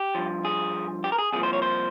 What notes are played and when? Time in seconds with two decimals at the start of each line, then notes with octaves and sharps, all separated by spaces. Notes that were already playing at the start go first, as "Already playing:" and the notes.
Already playing: G4
0.15 G2 F3
0.45 G#4
1.04 G4
1.12 A#4
1.18 G#4
1.32 C2 A#2 F3 G#4
1.43 C5
1.53 C#5
1.62 C5